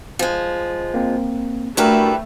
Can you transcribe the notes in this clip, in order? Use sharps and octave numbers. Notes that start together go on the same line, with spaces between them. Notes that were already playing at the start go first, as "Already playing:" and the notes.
F3 G#3
A#3 C4
G3 A3 D4 E4 F#4 A#4 B4